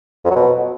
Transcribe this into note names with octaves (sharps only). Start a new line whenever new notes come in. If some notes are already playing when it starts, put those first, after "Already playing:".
F2
F#3
B2